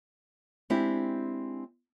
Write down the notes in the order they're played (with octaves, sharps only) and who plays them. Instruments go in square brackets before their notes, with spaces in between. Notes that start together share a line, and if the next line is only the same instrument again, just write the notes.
[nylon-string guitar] G#3 C4 D4 E4 G4